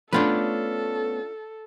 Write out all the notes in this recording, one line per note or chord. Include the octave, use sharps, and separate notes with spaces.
A3 B3 C#4 D4 F4 A4 B4